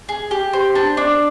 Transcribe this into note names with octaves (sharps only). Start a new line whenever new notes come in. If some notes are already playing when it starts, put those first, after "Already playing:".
G#4
G4
C5
D4
D4